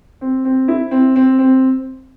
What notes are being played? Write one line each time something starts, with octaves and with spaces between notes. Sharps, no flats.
C4
C4
E4
C4
C4
C4